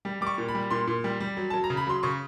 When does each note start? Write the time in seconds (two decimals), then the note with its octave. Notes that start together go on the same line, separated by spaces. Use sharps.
0.05 G3
0.21 G3 D6
0.27 C#6
0.38 A#2
0.48 B5
0.55 G3
0.71 A#2 C6
0.87 A#2
1.04 G3
1.20 G3
1.37 F#3
1.50 F#3 A5
1.64 A#5
1.70 C#3
1.77 B5
1.87 F#3 C6
2.03 C#3 C#6